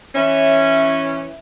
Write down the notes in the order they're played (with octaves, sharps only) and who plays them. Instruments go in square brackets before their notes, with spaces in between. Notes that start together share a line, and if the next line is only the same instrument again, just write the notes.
[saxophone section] E3 C#4 [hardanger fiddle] E5